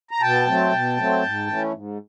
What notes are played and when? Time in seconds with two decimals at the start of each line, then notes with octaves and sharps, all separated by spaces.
0.11 A#5
0.22 B2 G5 A5
0.47 F#3 A3 C4
0.72 B2
0.97 F#3 A3 C4
1.23 G#2
1.47 E3 A3 C#4
1.73 G#2